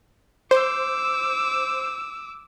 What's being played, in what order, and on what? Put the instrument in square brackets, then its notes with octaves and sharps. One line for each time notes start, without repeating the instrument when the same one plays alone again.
[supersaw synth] C5 [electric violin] D6 E6